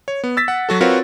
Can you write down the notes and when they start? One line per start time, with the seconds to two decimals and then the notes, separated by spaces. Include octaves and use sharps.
0.08 C#5
0.24 B3
0.37 E6 A6 B6
0.48 F#5
0.69 F#3 F#4 A4
0.81 C4 F4 F#4 A#4 B4 C#5